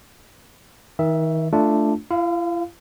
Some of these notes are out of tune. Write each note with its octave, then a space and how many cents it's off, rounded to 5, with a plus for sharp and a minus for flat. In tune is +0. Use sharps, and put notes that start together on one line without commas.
D#3 +35 E5 +0
A3 +0 D4 +0 F4 -15
E4 +45 F5 +0